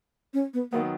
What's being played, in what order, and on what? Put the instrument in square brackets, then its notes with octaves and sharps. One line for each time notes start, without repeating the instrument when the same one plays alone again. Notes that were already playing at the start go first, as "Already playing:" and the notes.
[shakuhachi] C#4
B3
[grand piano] D#3 F#3 B3 [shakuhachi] A#3